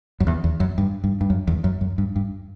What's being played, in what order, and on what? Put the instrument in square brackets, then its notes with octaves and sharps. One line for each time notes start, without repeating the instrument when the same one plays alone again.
[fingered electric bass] F#2
E2
E2
F#2
G2
G2
G2
F#2
E2
F#2
F#2
G2
G2